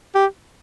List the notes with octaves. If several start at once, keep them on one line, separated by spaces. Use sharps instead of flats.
G4